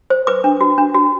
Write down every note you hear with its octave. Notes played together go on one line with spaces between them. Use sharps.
C5
B4 D6
D4
F#4
D4
F#4